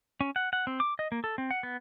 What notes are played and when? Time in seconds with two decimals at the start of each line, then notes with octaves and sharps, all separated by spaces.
0.21 C#4
0.36 F#5
0.53 F#5
0.67 C4
0.80 D6
0.99 D#5
1.12 A#3
1.24 A4
1.38 C4
1.51 F#5
1.63 B3